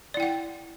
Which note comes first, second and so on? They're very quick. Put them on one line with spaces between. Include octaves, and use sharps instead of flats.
D5 E4 G5 F#5